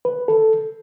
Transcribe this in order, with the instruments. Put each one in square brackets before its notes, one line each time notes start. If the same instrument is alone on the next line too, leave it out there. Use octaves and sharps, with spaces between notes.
[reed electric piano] B4
A4